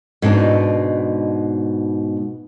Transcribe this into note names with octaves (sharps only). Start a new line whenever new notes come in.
G#2 B2 D4 D#4